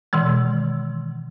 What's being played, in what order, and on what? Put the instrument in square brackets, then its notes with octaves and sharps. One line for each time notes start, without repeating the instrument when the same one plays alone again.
[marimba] B2 D#3 E3 G#3